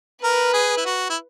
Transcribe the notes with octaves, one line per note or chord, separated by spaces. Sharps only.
A#4 B4
G#4
E4
F#4
E4